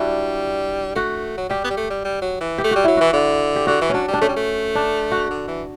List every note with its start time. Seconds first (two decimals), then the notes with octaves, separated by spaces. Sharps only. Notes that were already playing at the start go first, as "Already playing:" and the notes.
Already playing: G3 D4 E4 F#4
0.95 A3 F#4
1.37 F#3
1.49 G3 G4
1.64 B3
1.70 G3
1.77 A3
1.90 G3
2.05 G3
2.22 F#3
2.40 E3
2.58 G4
2.64 A3
2.71 G3 F#4
2.84 F#3 E4
2.97 E3 F#4
3.13 D3
3.56 G4
3.67 D3 F#4
3.81 E3
3.90 F#3 C#4 D4
4.08 G3
4.14 D4
4.21 A3 C#4
4.28 G3
4.37 A3
4.75 D4
5.12 F#4
5.30 D3
5.48 E3